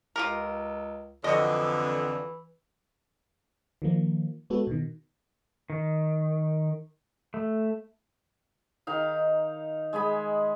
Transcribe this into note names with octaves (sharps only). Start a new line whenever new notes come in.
C#2 F4 G4 A#4
F2 D3 E3 F#4 D#5
D#3 F3 A#3
G#3 B3 F#4 A4
B2 D#3
D#3
A3
D#3 D#4 F5
G#3 D#5 G#5 B5